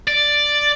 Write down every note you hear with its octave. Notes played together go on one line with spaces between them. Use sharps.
D5